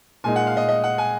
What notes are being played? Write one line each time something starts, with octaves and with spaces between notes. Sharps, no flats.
A#2 G#3 D#4 G#5
F#5
F5
D#5
D#5
F#5
G#5